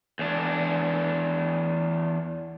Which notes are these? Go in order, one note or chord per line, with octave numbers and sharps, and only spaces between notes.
E2 D4